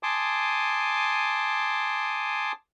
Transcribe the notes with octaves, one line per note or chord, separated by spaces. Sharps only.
G#5 A5 C6 D6 D#6